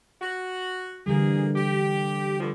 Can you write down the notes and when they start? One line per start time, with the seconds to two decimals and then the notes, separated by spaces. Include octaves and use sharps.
0.21 F#4
1.06 D3 E3 G3 A#3 G#4
1.56 G4
2.40 G2 D3 F3